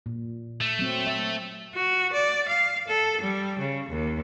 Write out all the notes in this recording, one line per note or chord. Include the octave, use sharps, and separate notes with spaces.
A#2
A3
F#3 C4
E5
F#4
D5
F5
A4
G3
C#3
D#2